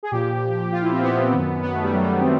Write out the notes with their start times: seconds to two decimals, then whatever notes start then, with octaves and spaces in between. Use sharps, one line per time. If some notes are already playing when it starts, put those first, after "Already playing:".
0.03 G#4
0.11 A#2 F3 G4
0.72 F4
0.82 E4
0.92 C4
1.02 B3
1.32 F#2 D#3
1.63 B3
1.73 A3
1.83 G3
1.93 F#3
2.03 G3
2.13 B3
2.21 C4